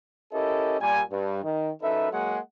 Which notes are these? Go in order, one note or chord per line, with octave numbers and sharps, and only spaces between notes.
C#4 E4 G4 A4 A#4 D#5
A#2 G3 G#5
G2
D#3
F#2 D#4 A4 B4 E5
F#3 G#3 A#3 G#4 F#5